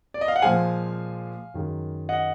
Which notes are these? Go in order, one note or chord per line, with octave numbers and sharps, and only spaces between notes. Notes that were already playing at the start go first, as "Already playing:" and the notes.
D5
D#5
F5
F#5
A#2 F3 G#3 F5 G#5
F#2 D#3 G#3
D#5 F#5